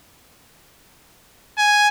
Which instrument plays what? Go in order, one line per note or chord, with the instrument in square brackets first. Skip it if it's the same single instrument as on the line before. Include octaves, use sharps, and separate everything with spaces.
[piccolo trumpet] G#5